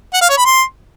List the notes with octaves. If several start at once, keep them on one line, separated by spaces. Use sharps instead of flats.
F#5
F5
C#5
B5
C6